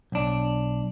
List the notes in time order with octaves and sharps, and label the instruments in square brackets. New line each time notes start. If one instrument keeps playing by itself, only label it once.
[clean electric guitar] B1 D4